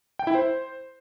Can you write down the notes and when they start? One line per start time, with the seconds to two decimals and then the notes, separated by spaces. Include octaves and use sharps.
0.19 G5
0.27 E4
0.35 C5